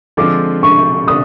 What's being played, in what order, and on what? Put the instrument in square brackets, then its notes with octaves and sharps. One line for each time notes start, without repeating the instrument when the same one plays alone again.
[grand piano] D3 F3 G#3 C4 F4 [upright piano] D6
[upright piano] C#6
[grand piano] D3 [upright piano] D#6